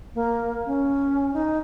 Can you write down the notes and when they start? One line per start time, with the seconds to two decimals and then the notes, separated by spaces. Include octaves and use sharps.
0.15 A#3
0.66 C#4
1.34 D#4